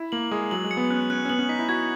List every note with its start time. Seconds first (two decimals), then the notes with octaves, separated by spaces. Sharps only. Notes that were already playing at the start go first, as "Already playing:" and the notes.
Already playing: E4
0.12 A#3 F#7
0.31 G#3 D#6
0.51 F#3 F#7
0.64 G#3
0.71 C#7
0.77 B3
0.90 C#4 F#6
1.10 C#4 F#6
1.25 C#4
1.29 B3 F#7
1.39 C#4
1.49 D#4 B6
1.59 E4
1.69 F#4 G#6